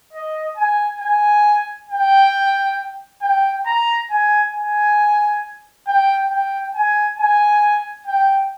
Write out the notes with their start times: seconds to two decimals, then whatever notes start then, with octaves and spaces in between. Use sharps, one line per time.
0.13 D#5
0.57 G#5
1.01 G#5
1.89 G5
3.22 G5
3.66 A#5
4.10 G#5
4.53 G#5
5.87 G5
6.31 G5
6.75 G#5
7.19 G#5
8.07 G5